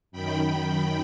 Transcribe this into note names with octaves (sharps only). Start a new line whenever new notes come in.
F#2 D#3 G5 B5